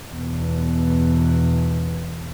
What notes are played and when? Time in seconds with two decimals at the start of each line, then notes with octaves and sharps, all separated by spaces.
0.13 E2 B2